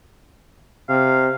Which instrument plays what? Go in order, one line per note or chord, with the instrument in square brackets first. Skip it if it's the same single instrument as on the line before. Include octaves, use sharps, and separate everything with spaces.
[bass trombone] C3 [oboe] F5